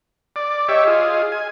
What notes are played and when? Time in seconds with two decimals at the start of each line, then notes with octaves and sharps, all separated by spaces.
0.36 D5
0.68 G4 C#5 D#5 E5
0.87 F4 G#4
1.32 G#5